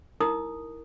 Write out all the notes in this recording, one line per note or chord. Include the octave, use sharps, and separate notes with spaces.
D#4 E4 A#4 D#6